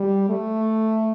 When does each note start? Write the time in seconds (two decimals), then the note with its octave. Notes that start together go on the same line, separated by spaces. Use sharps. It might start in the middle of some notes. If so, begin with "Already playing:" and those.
Already playing: G3
0.29 A3